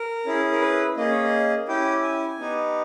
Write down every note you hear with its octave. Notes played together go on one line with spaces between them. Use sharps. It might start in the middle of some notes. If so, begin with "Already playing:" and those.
Already playing: A#4
C#4 E4 G#4
A#4
B4
A#3 C#4 G#4 D#5
C#5
D#5
C#4 E4 G4 G5
G#5
B3 D#4 G4